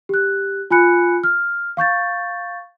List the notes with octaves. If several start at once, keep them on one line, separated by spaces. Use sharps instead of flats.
G4 F#6
F4 G#5 B5 F#6 C#7
F6
F5 C#6 G6 A6